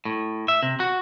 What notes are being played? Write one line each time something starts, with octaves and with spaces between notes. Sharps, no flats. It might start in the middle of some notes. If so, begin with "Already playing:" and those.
A2
E5
C3
F#4